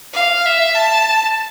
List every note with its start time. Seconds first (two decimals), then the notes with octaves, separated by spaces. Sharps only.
0.14 F5
0.45 E5
0.75 A5